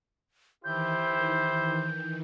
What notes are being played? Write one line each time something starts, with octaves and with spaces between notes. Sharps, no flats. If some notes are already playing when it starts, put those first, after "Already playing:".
D#3 E3 E4 G4 C5 G6